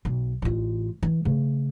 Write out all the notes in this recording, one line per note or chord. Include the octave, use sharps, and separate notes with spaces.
B1
A1 F4
E3
C#3 A3